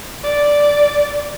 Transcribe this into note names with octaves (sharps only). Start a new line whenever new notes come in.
D5